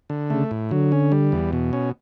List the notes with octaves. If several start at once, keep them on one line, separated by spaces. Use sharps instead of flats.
D3
C#3 A3
A2
D3 F#3
C#4
G3
E2
B2
C#4